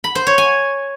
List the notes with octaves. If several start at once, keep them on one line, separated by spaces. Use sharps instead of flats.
B5
C5
C#5
G#5